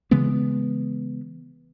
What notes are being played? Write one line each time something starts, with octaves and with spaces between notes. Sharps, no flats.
C#3 E3 G#3 B3